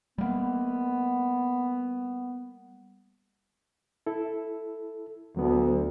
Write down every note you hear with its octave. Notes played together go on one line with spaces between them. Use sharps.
G3 A#3 B3
E4 A4
D2 F#3 B3